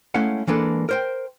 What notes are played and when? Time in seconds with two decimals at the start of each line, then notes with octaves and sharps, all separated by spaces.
0.14 G#3 A3 C#4 E4 F5 F#5
0.47 E3 G#3 A#3 D4 A4 B4
0.89 A#4 C5 G5